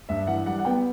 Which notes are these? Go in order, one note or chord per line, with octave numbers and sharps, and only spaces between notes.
G2 E5
E3 F#5
G3 F#5
F#5
B3 G5